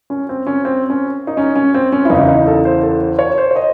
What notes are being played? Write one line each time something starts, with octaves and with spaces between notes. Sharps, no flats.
C#4
C4
C#4
C4
C#4
D#4
C#4
C#4
C4
C#4
E4
E2 C#3 E3 D#4
D#4
A4
C5
A4
C5
C#5
C5
C#5
D#5